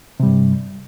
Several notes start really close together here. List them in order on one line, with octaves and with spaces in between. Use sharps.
C3 G3 G2